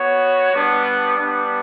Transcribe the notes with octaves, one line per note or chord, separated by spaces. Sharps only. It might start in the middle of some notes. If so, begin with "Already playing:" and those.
Already playing: B3 F#4 C#5
G3 B3 D4
G3 B3 D4